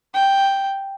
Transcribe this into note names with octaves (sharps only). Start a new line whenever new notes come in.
G5